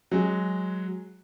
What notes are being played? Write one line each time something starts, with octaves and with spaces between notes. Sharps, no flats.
F#3 G#3